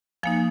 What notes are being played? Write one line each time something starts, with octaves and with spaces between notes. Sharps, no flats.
F3 A#3 D#4 F5 G#5